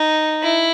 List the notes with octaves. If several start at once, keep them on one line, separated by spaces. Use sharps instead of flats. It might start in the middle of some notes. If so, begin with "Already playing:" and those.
Already playing: D#4
E4